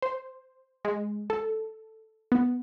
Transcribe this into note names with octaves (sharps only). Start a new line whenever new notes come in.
C5
G#3
A4
B3